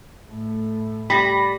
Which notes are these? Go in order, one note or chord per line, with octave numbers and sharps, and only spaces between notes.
A2 A3
G3 B5 A#6